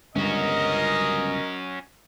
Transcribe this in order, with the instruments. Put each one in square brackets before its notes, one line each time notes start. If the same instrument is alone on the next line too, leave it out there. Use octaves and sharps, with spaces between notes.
[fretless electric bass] G1 C#2 G2 [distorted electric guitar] C#4 F#4 [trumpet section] A#4 D#5